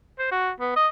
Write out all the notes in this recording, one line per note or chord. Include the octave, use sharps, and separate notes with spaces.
C5
F#4
B3
D#5